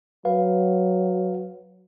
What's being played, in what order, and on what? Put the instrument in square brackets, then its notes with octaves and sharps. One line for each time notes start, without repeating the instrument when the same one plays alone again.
[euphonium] F#3 [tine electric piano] B4 F5